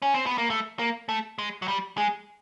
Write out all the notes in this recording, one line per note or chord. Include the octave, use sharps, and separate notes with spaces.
C#4
C4
B3
A#3
A3
A#3
A3
G#3
F#3
G3
G#3